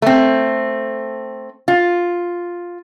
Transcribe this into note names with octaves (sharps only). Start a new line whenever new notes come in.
A3 C4
F4